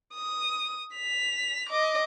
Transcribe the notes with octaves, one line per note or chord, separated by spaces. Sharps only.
D#6
B6 F7
D#5 D6